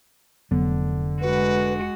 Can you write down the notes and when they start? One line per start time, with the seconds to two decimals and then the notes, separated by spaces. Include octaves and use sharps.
0.51 F1 D3 F#3 B3
1.21 G#3 F#4 B4